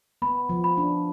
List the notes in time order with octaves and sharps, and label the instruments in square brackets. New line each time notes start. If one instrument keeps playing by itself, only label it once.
[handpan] B3 [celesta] B5
[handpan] F3
[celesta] B5
[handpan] D4